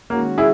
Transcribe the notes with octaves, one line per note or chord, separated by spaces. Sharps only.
D#3 G#3 A#3 C#4 F#4
E4 G#4